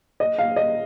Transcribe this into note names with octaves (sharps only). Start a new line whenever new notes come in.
D#5
F5
D#5